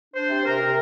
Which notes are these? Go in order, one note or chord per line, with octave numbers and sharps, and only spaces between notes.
D4 C5
C3
C3 A#4
C3